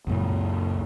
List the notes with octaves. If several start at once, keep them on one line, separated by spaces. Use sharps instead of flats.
C#2 F#2 A#2 F#3